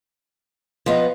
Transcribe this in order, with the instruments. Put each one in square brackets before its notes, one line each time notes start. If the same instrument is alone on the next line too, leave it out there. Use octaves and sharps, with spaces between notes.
[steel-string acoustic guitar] F3 B3 [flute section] D#5